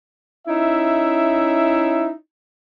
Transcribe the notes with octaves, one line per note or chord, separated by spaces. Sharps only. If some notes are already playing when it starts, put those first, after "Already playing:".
C#4 D#4 E4 E5